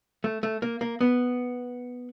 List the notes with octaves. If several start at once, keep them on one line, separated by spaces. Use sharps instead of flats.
A3
A3
A#3
A#3
B3